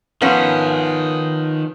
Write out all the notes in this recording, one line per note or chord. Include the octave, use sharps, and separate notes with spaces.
D#3 F3 B3 C#4 G#4